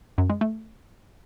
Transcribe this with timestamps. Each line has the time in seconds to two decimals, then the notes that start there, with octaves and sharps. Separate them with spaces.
0.18 F#2
0.30 G#3
0.41 A3